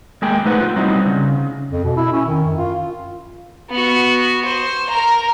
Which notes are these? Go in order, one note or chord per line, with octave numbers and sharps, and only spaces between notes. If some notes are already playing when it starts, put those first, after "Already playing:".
G#3 A#3 G#4 G5
A3 D#4 B4 C5 F#5
F4
F#3 G3 C4 D#4 E4
C#3
F2
B2
E4
C#4
D#3
F#2
F4
B3 F#4
C5
A#4 A#5